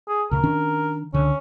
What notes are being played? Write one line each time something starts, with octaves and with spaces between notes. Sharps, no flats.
G#4
D2 C#3 A#4
D#3 C#4 D4
C#2 D3 C#4